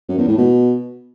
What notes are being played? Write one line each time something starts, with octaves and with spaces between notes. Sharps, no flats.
F#2
E2
A2
B2